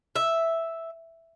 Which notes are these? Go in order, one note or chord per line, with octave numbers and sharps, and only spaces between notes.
E5